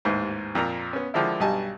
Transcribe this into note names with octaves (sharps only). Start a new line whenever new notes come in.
A1 D#2 G#2 B4 C5
F2 A#2 A#3 A#5
B3 C#4
D3 D#3 F3 G#3 D4 E4
B1 G2 G3 D#5 G#5 A5